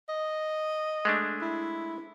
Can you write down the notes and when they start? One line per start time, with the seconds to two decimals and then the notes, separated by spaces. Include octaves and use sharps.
0.09 D#5
1.05 G#3 A3 D4
1.41 E4